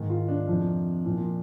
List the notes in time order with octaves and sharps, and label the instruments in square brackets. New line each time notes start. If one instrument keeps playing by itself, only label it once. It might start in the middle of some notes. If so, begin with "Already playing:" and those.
Already playing: [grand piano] G#2 D#3
F4
D4
F2 C3 F3
A#2 F3